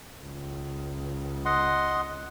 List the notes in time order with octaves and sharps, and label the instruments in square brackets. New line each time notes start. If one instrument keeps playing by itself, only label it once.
[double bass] C#2
[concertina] D#5 F#5 C6